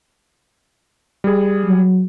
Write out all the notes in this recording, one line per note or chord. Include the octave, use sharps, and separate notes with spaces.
G3 G#4
F#3